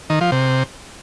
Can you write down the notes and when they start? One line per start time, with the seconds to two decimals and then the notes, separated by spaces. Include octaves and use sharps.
0.10 D#3
0.21 F3
0.32 C3